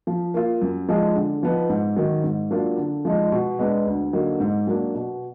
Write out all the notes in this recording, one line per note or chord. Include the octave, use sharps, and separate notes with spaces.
F3
A#3 F4 A#4
F#2
F3 G#3 D#4 G#4
D3
F3 B3 D#4
G#2
D#3 F#3
G#2
F#3 A#3 D4 F4
D3
F3 G#3 D#4
B2
G#3 B3 D4
D2
D3 F#3 A#3 D#4
G#2
F#3 A#3 D4
B2